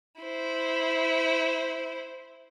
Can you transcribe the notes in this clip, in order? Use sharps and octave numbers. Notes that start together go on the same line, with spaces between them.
E4 C5